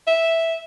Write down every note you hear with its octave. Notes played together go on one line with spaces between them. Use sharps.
E5